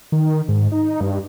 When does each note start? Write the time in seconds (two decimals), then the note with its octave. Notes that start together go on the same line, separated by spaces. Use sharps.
0.12 D#3
0.48 G#2
0.72 D#4
1.01 G2